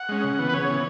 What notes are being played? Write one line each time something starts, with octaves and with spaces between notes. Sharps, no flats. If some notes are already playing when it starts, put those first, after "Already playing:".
Already playing: F#5
G#3 C#4
C#3
E3 B3
B4
C#3 C#5
E3 B3